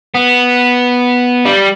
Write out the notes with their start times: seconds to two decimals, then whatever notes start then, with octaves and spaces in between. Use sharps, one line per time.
0.15 B3
1.45 G3